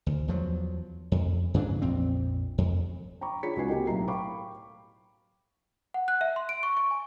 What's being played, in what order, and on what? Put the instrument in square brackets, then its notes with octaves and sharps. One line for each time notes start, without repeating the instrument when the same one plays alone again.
[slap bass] D2
E2 F3 F#3
F2
G2 C#3 E3 D4
A#1 F2 C4
F2
[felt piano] G5 A#5 B5 C#6 D6
D4 F4 G#4 C#5 B6 C#7
C#2 D#4 F#4 B4 G#5 C7
A#3 C4 F#4 G4 A4 D#5
B1 A2 F#3 A#4 A#5 C7
F5 G5 B5 C#6 D6
[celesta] F#5
F#6
E5
C6
D7
C#6
C#6
G#5